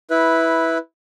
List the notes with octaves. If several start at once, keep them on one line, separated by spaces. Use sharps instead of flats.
E4 B4